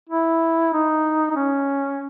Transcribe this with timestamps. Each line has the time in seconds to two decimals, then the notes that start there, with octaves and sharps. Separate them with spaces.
0.09 E4
0.73 D#4
1.31 D#4
1.36 C#4